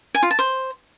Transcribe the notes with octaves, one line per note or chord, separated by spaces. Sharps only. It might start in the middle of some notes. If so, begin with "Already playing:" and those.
G#5
F4
A5
C5